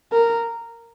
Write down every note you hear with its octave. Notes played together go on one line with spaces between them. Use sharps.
A#4